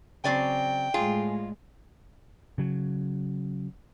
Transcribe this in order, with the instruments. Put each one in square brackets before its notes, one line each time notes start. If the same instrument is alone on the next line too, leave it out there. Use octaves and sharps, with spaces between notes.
[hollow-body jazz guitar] C#3 C4 [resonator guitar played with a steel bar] F#3 D5 G#5 [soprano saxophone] G5
[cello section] A2 G#3 [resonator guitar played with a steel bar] F4 [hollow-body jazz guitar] G#4
[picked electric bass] C#3 F#3